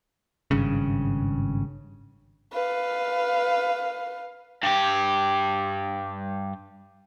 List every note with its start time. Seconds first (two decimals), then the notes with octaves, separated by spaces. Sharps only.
0.51 G#1 G2 C#3
2.53 B4 F5
4.63 G2 G4